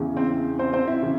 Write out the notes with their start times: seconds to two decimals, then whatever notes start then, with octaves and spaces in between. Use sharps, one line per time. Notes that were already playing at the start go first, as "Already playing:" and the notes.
Already playing: E2 C#3 E3
0.17 C4 C5
0.59 C4 C5
0.73 C4 C5
0.87 E4 E5
1.02 C#3 E3